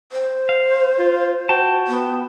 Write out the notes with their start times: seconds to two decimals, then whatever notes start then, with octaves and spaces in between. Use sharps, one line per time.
0.12 C5
0.49 F5
0.99 F4
1.49 F#4 G5 A5
1.87 B3